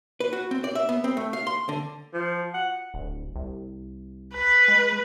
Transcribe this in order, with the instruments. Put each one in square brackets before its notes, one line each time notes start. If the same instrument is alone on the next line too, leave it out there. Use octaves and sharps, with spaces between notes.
[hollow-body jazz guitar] B4
F#4
C4
D5
E5
B3
C4
A3
F5
C6
D3
[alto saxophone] F3
F#5
[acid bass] D1
C2
[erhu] B4
[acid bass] G#3